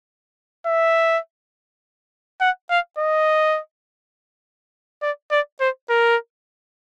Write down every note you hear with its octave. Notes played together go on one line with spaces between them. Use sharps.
E5
F#5
F5
D#5
D5
D5
C5
A#4